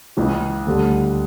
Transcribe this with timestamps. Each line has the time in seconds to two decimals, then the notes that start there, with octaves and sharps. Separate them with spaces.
0.17 C#2 C#3 E3
0.67 D2 D3 G3